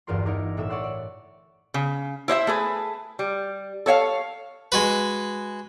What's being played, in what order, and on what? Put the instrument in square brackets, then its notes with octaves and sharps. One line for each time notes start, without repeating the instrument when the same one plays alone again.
[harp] G1 E2 G2 F4 A#4 C6
D#4 E4 A#4 D6
B1 A2 E5 E6
C#5 D5 F#5 C6
D5
[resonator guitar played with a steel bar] C#3
E4 C5 D#5 E5
A3 G#4 B4
G3
A4 C#5 E5 F5
[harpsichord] G#3 F#4 B4